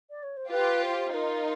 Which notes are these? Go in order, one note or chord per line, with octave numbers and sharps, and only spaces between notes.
D5
C#5
C5
F4 G4 B4
C5
D#4 F4 A#4